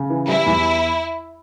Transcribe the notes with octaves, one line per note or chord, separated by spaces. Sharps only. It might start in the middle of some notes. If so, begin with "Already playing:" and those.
Already playing: C#3
E3
G3 E4
E2